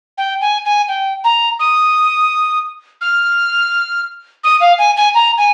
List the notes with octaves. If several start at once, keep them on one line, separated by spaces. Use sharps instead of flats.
G5
G#5
G#5
G5
A#5
D#6
F6
D#6
F5
G#5
G#5
A#5
G#5